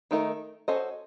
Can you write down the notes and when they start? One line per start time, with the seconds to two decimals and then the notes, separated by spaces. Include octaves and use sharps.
0.11 D#3 A3 D#4 F#4 A#4
0.68 C#4 F#4 A4 C5 D#5